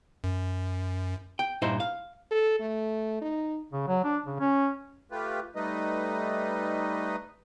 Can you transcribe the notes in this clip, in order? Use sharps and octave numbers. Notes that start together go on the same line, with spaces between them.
F#2
G5
G2 A#2 D#4 E4 C5
F5
A4
A3
D#4
C#3
F#3
D4
C#3
C#4
A3 F4 G4 B4
G3 A3 D#4 B4 D#5